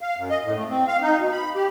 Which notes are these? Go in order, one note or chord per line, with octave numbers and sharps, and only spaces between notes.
F5
F#2
D#5
A2
A3
C4
F5
D#4
B2
B5
G4